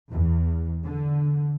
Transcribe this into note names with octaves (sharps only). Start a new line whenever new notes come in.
E2
D3